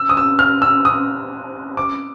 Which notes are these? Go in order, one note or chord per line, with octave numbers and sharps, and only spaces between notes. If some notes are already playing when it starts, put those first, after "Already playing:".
Already playing: E6
D#6
E6
F6
E6
D#6
D6